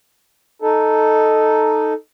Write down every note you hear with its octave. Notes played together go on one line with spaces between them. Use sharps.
D#4 A4